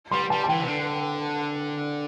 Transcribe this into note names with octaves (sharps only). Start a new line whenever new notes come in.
G3 C6
G3 A5
A5
E3 G5
C3
D3